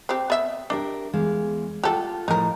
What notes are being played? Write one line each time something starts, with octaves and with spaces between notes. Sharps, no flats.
C4 G4
B3 E5
D4 G4 A#4 E5
E2 G#3 F5
F4 G4 A4 F#5
A2 F3 D#4 A#4